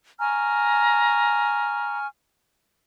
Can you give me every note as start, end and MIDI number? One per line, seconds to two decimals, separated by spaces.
0.19 2.06 80
0.19 1.98 82
0.19 2.06 85
0.19 2.06 89